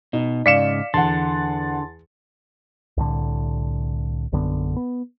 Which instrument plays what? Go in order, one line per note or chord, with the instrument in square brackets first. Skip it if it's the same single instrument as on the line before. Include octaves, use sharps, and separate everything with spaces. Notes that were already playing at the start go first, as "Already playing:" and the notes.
[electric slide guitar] B2 [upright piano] D#4
[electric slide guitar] G#2 C#3 [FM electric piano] D5 F5 [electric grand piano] B6 C#7 E7
[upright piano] E2 F#5 [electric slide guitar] D3 [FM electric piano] A5 C6 A6
[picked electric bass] C2 A2 D3
A#1 F#2 D3 B3
B3